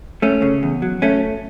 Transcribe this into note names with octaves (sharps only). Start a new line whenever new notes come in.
A3 C#4
C#3
E2
F#3
A3 C#4